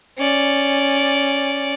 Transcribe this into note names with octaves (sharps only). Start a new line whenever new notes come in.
C#4 D5